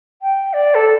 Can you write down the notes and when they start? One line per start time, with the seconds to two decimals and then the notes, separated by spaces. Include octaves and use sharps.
0.22 G5
0.54 D5
0.75 A4